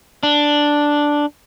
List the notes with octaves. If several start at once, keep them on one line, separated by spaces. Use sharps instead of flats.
D4